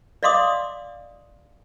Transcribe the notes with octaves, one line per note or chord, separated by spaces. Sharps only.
D5 D#5 F5 C6 D6 D#6